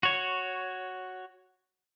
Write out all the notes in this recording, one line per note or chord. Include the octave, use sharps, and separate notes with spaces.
F#4 C#5